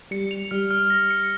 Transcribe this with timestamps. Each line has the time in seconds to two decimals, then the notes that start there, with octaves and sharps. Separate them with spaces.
0.11 G3 C#7
0.31 F7
0.51 G3 F6
0.71 F6
0.90 A#6
1.10 C#7